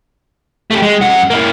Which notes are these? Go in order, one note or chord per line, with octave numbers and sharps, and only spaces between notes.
A3 G4
G#3
F#2 F#5
A#3 E4